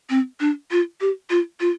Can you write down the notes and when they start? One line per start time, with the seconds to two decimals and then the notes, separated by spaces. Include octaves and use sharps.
0.10 C4
0.40 D4
0.71 F4
1.01 G4
1.30 F4
1.60 F4